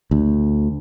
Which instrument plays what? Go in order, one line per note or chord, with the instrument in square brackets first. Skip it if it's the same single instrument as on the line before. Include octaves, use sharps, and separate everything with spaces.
[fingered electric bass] D2